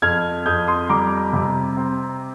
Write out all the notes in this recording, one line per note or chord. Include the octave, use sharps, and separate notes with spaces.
F2 F6 G#6
F2 D#6 G6
C6 D#6
G3 A#5 D6
C3
C4